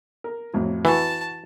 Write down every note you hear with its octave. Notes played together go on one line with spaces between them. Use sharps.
A#4
F2 A2 F#3
E3 F#4 A5 C#6